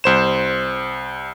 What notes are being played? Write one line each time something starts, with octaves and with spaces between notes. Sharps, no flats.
C2 C5 E7